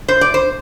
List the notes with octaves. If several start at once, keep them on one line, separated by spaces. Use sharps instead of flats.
C5
D5
C5